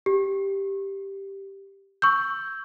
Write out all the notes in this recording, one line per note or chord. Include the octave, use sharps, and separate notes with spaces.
G4
C#6 E6 G6